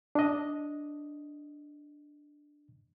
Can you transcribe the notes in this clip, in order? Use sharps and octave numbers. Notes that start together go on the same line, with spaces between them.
D4 D#5